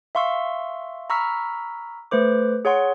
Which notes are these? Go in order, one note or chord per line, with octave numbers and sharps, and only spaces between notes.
E5 F5 C6 C#6 E6
A#5 B5 C#6 E6 F6 B6
A3 B4 C5 D6
G#4 C#5 F#5 C6